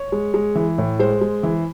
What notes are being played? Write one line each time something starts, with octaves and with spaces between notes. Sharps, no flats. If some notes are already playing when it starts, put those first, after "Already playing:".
Already playing: C#5
G#3
G#3
E3
A2
G#3 C5
G#3
E3